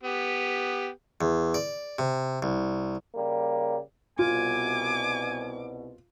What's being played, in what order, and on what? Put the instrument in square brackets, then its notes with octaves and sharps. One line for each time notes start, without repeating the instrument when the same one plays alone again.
[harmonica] B3 G4
[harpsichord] E2
D5
C3
C2
[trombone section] C#3 G3 A#3
[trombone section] C2 B2 [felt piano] F4 [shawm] G#5 [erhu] D6